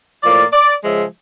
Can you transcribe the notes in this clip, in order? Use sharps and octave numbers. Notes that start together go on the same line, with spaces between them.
A2 F3 A#3 D5
D5
C#3 F3 G#3 E5